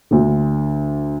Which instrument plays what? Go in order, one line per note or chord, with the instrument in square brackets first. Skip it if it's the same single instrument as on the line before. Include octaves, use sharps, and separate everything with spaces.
[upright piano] D2 D3